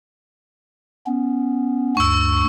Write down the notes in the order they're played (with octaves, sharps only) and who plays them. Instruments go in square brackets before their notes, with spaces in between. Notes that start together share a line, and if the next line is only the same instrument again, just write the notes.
[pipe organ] B3 C#4
[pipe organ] D2 G2 [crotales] C#6 E6